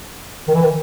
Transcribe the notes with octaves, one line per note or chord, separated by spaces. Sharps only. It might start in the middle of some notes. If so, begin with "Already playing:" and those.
D#3
E3
D#3